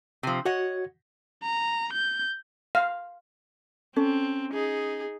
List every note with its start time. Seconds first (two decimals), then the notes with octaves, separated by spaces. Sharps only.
0.23 C3 F3
0.45 F#4 C#5 D#5 F#5
1.43 A#5
1.93 G6
2.75 F5
3.96 C4 C#4 A4
4.53 D#4 G#4